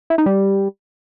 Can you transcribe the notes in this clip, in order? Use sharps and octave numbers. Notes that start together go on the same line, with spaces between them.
E4
D#4
G3